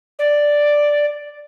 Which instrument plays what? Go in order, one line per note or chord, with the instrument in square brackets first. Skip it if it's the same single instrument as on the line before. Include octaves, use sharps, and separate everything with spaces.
[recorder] D5